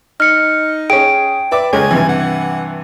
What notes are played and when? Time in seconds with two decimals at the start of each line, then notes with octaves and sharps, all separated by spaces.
0.20 D#4 F6 C#7
0.90 C#4 G#4 G5 D7
1.52 B4 D5 E5 D6
1.73 C#2 G#3 C#4 G#5
1.91 G2 C3 E3
2.09 F#5